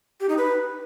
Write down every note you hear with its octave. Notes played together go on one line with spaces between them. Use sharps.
G4
D#4
B4